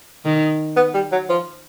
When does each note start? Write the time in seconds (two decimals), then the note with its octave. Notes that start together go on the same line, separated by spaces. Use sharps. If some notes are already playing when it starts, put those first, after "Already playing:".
0.25 D#3
0.76 B3
0.94 G3
1.12 F#3
1.29 F3